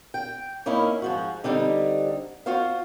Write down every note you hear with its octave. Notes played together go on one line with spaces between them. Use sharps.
G5
A#3 C#4 D#4 E4
G#2 F3 F#4
D3 G3 C4 D#4
F4 F#4 C5 F5